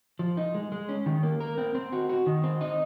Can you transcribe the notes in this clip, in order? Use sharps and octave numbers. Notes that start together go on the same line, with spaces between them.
F3
D#4
G#3
G#3
C#4
D#3
A#3
A#4
C4
C4
F#4
F#4
D#3
C4
D#4